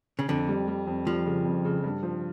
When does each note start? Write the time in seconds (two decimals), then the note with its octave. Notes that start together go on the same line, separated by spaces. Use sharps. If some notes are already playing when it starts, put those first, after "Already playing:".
0.19 C#3
0.29 F2 D3
0.48 G3
0.68 G3
0.87 F2
1.07 F3 G3
1.26 C#3
1.45 F2
1.65 C#3
1.84 G2
2.03 F3